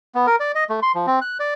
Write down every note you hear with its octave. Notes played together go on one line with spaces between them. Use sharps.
B3
A#4
D5
D#5
A3
C6
F3
C4
F#6
D5